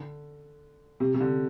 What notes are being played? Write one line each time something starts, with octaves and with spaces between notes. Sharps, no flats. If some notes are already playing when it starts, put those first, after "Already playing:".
Already playing: D3
C3
C3
D3